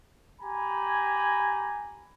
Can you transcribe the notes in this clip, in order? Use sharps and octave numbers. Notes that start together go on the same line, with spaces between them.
G4 G#5 A#5 B5